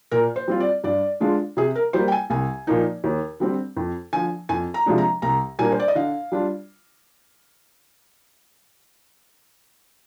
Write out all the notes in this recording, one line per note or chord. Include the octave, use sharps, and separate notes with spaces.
A#2 A#4
C5
G3 C4 F4
D5
G2 D5
D3 G#3 D4 F4
C3 G#4
A#4
G3 A#3 C5
G5
G#5
C2 G#5
A#2 F3 A#3 D#4
D#2
D3 G3 C4
F2
D3 F3 G#5
F2 G#5
A#5
C3 F3 G#3 D4
A#5
C2 A#5
A#2 G3 A#3 D4 G#5
C5
D5
D#5
D3 F5
G3 D4 F4